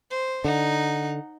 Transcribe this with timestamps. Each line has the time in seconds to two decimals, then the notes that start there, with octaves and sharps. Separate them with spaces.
0.11 C5
0.44 D3 D#4 F#5